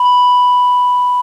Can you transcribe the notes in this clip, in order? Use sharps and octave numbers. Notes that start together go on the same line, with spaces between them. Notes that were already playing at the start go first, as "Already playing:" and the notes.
Already playing: B5